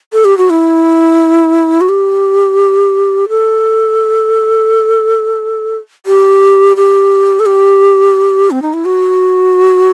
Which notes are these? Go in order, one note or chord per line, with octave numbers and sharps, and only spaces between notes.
A4
G4
F#4
E4
F#4
G4
A4
G4
G4
A4
G4
C4
D#4
E4
F#4